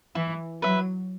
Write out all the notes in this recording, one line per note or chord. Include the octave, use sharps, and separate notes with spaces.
E3 E4
F#3 B4 E5